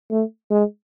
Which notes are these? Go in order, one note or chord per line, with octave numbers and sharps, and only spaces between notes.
A3
G#3